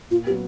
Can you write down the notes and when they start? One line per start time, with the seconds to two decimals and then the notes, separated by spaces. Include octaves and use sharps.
0.11 A#2 F4
0.27 F#3 B3 G4